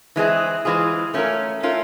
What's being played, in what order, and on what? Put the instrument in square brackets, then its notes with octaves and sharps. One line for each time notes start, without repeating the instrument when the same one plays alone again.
[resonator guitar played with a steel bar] E3 G#3 C4 F4 G#4
E3 G#3 C4 F4 G#4
A3 C#4 F4 A#4
A3 C#4 F4 A#4